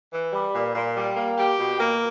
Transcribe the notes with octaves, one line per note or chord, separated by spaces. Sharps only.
E3
G3
A#2
A#2
G3
A#3
G4
B2
A#3